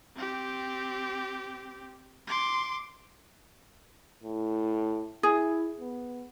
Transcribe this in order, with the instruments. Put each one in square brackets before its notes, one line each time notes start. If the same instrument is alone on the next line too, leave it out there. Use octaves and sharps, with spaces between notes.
[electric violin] C4 G4
C6 D6
[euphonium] A2
[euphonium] E4 [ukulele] G#4
[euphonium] B3